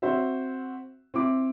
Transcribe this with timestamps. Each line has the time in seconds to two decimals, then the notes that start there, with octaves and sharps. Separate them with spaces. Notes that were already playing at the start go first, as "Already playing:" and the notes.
0.02 C4 F#4 C5 E5
1.14 C4 E4 D6